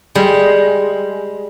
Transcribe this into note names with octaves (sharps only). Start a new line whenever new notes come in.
G3 G#3